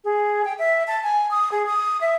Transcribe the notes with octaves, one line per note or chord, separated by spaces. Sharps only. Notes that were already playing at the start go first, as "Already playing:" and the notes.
G#4
G5
E5
A5
G#5
D#6
G#4
D#6
E5